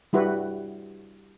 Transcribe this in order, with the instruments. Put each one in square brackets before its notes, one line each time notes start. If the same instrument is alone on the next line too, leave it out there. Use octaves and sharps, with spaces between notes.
[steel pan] G3 E4 F#4 B4